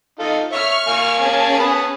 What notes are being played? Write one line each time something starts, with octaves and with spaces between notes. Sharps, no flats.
D#4 F4 A4
C#5 E5 C#6 F6
A#3 F5 G#5
C#4 G#4 A5
B3 B5